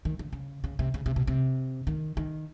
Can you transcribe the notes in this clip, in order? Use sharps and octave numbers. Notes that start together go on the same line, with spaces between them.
D#3
D3
C#3
C#3
C3
C#3
C3
B2
C3
D#3
D#3